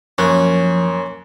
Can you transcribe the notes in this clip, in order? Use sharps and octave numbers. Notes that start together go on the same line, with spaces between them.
F#2 F3 A#3 C#4 F#6